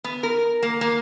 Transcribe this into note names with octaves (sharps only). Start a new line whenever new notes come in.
B3
A#4
A#3
A#3